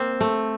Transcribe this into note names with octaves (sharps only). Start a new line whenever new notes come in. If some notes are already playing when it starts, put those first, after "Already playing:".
Already playing: A#3 C4
A3